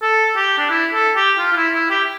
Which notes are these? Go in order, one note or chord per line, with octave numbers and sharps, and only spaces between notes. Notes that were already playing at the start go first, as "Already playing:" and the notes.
A4
G4
D4
E4
A4
G4
F4
F4
E4
E4
G4